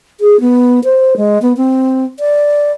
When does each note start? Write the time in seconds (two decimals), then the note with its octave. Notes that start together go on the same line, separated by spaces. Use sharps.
0.20 G#4
0.40 B3
0.84 C5
1.17 G#3
1.42 B3
1.57 C4
2.20 D5